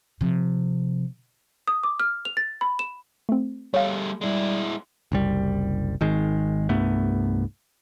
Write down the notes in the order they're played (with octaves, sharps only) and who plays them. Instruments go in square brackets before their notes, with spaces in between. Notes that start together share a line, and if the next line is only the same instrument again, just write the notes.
[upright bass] C3 F3
[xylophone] D#6
D6
F6
F7
A6
B5
E7
[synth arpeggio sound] A3 C4
[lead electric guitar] G3 A3 [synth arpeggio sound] C#5 F5
[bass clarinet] G3 [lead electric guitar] G#3 E4
[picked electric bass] F#1 C2 G3
G#1 D#3 G#3
C2 G2 A3 B3